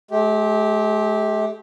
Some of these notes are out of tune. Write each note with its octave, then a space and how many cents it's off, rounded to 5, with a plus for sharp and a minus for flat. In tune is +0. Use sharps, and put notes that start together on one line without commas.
A3 -45 G4 +0